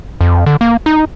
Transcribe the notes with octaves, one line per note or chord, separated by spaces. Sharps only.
F2
D3
A#3
D#4